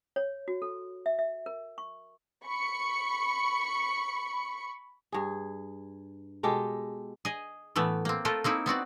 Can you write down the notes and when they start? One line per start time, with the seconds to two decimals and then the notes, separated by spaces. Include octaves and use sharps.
0.16 C#5
0.48 F#4
0.62 A4
1.06 E5
1.19 E5
1.46 A#4
1.78 C#6
2.46 B5 C#6 C#7
5.12 G2 G#4
6.43 B2 G#3 G4 A4
7.25 G#4 D#5
7.76 A2 E3 A3 B3
8.05 A#3 C4
8.25 A3 F4 A4 A#4
8.44 A#3 C4 D#4 E4
8.66 B3 C4 F#4 D5